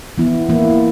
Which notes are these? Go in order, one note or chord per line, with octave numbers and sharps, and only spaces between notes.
E3 B3 E4
E3 A#3 E4